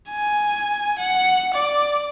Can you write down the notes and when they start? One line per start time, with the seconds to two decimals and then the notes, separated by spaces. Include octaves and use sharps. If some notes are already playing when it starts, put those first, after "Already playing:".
0.10 G#5
0.99 F#5
1.54 D5